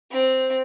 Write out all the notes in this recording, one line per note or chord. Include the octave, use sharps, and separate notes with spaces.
C4